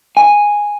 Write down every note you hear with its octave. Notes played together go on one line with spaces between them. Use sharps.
G#5